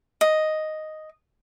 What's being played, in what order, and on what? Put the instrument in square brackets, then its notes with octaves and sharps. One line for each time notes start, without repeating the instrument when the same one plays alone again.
[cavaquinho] D#5